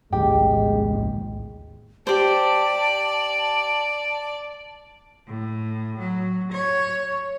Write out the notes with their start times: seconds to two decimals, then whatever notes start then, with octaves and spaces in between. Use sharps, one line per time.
0.13 A#1 D#2 A2 G#3 G4
2.07 G4 C5 D5 A5
5.27 A2
5.99 F#3
6.52 C#5